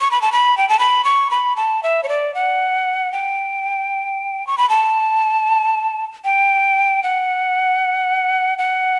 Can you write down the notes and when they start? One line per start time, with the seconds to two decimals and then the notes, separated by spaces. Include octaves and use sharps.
0.01 C#6
0.11 B5
0.22 A5
0.32 B5
0.58 G5
0.69 A5
0.79 B5
1.05 C#6
1.31 B5
1.56 A5
1.83 E5
2.03 C#5
2.09 D5
2.34 F#5
3.12 G5
4.47 C#6
4.58 B5
4.69 A5
6.25 G5
7.03 F#5
8.58 F#5